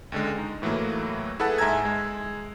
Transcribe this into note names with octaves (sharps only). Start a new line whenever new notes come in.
C#2 D3 G#3
D#4
A2 E3 F#3 A3 A#3
E4 G#4 A4 B4 F#5 A5
G#2 E5 G#5 A#5 E6 G#6
G#3